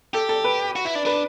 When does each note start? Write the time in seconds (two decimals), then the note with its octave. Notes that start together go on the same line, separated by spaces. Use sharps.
0.14 G4 A4
0.29 A4
0.44 B4
0.76 F#4
0.85 E4
0.95 D4
1.06 D4 B4